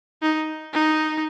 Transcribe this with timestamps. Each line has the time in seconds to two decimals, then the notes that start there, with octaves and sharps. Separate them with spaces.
0.22 D#4
0.74 D#4